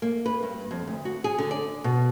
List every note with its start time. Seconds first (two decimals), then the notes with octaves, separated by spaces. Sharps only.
0.02 A#3
0.26 B4
0.43 G2
0.71 F2
0.87 D2
1.05 F#4
1.24 G#4
1.38 D3
1.51 D5
1.84 B2